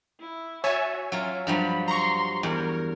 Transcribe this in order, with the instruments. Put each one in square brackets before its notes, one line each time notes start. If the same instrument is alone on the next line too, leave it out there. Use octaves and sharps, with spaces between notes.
[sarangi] E4
[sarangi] F#4 [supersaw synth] C#5 E5 G#5 [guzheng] A5
[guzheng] F#3 F4 [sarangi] C#4
[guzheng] G2 F3 F#3 [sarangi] B5
[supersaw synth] A#5 C#6 [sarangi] C6
[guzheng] E2 [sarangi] A#4